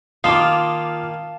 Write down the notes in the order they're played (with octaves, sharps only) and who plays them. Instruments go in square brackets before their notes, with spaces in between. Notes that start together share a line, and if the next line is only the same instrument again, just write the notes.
[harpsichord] D#3 A#3 [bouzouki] F4 [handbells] F5 A5 [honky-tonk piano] D6 D#6